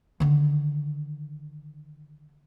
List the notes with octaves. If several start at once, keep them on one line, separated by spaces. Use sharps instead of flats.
D3 D#3